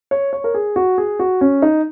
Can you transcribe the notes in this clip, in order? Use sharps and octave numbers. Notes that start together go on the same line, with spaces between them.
C#5
C#5
A#4
G#4
F#4
G#4
F#4
C#4
D#4